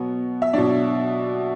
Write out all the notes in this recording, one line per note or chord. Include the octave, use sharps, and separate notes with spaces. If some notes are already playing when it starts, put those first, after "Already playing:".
Already playing: B2 F#3 B3
E5
B2 F#3 D4 D5